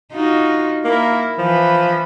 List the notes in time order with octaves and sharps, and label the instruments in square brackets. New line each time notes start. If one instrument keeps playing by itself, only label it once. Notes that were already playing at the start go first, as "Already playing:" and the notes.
[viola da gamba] D#4 F4 F#4
[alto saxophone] A#3 [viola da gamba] E4 A#4
[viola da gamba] E3 B4 [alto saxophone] F3